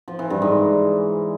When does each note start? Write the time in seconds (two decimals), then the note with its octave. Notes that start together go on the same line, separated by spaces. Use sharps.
0.08 F3
0.19 E3
0.30 G2
0.42 G#2